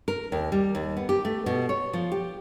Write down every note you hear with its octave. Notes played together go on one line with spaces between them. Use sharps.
A#4
D#2
G3
D#2
B3
G4
A3
B2
C#5
F3
G4